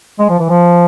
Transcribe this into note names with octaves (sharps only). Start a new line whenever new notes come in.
G#3
F3
E3
F3